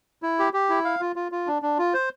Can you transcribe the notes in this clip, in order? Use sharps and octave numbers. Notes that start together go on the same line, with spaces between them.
E4
G4
G4
E4
F5
F4
F4
F4
D4
D4
F4
C5